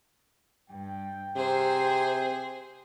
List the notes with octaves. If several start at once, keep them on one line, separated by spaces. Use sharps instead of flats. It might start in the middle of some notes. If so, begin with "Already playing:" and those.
G2 G5
C3 G#4 C5